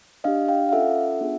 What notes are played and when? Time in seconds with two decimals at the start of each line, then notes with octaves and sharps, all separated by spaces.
0.24 D4 G4 D#5 F5
0.48 F5 G5
0.69 F5
0.72 C#4 F4 A4 E5 F#5
1.21 B3 D4 F4 G#4